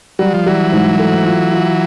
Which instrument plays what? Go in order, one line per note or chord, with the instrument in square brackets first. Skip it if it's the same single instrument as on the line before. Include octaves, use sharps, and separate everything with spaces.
[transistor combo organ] F#3 [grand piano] G3
[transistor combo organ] F3
[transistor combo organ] E3 F#3 [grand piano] G3
[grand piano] G#2
A3
F4
F4